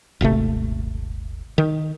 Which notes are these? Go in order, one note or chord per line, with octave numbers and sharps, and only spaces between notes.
D#1 G#1 C3 A3
D#3